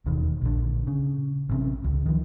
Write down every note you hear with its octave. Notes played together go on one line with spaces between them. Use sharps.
E1 D#2 D#3
A#1 D3
C#3
A1 C3 C#4
C#2
D#3 F3